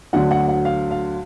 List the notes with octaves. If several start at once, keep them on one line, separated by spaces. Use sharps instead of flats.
D2 D3 F#3 F#5
F#5
F#5
F5
F5